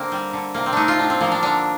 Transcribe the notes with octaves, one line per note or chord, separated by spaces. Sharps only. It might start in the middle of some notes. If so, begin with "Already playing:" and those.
Already playing: D3 A#3 C4
G3
D3
C3 A#3
C4
A3 D4 D#4
F4
A2 D4
C4
F3 A#3
D4
D3 D4